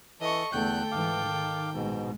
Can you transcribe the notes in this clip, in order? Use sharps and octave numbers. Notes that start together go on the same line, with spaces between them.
E3 A4 D#5 C#6
E2 D3 A3 A4 G5 F#6 G6
G#2 E3 F5 D6
D#3
A#1 G#2 B2 G#3